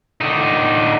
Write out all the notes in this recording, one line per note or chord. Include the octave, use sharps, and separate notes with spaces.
D3 D#4